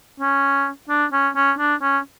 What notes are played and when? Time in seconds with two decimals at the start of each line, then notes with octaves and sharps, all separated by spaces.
0.20 C#4
0.89 D4
1.13 C#4
1.36 C#4
1.59 D4
1.82 C#4